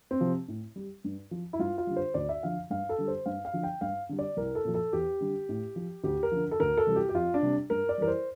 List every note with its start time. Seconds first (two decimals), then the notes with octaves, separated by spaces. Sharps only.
0.11 C4
0.21 C3 F3
0.48 A2
0.76 G3
1.04 G2
1.31 F3
1.53 E4
1.59 G2 F4
1.78 F4
1.87 D3 G3
1.96 C5
2.14 D2 D5
2.29 E5
2.43 D3 F3 F5
2.70 G2 F5
2.89 A4
2.98 D3 G3
3.08 C5
3.26 G2 F5
3.45 F5
3.53 D3 F3
3.63 G5
3.81 G2 F5
4.09 D3 G3
4.19 D5
4.37 C2 A#4
4.55 A4
4.65 A#2 F3
4.74 A4
4.93 E2 G4
5.21 D3 G3
5.49 A2
5.76 F3
6.04 D2 G4
6.23 A#4
6.32 D3 F3
6.51 A4
6.60 D2 A#4
6.77 A4
6.87 C3 E3 G3
6.96 G4
7.09 G4
7.14 F2 F4
7.34 D4
7.42 C3 G3
7.70 G2 A#4
7.89 D5
7.98 E3 G3 A#4
8.08 C5